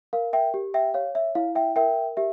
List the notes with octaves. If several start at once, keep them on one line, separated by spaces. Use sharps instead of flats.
A#4 F5
E5 G5
G4
E5 G5
C#5 F5
E5
E4 F5
E5 G5
A#4 E5 G5
G4 E5